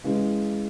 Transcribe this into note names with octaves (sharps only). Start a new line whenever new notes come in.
C#3 E3 G#3